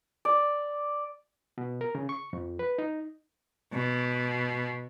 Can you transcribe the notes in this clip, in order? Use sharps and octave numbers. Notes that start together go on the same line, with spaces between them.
D5
B2
A#4
C#3
C#6
F2
B4
D#4
B2